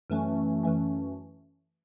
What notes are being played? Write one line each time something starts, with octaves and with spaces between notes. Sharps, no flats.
F#2 E3 A3 C#4
F#2 E3 A3 C#4